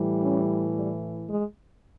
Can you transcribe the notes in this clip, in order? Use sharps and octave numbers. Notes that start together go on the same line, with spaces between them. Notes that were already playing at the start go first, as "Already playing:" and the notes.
Already playing: A2 E3 G3
C#4
G3
G#3